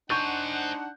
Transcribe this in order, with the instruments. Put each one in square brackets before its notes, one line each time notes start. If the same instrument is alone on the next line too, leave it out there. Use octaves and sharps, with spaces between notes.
[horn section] D4 D#4 F#5 [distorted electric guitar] C5 G#5 [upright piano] C#6 G6